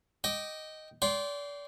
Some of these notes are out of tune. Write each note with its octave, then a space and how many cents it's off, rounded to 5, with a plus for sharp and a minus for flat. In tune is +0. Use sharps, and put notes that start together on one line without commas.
D#5 +0 G5 -15 D6 +5
D5 -35 G5 -15 C6 +0